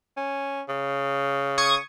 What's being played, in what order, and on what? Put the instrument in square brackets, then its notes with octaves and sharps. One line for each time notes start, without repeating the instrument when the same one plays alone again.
[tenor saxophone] C#4
C#3
[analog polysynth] C#6 D#6 G#6